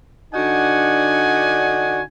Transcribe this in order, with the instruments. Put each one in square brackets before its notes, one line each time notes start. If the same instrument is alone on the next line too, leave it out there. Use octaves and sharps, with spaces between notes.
[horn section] D3 D4 D#4 F#4 F#5 G#5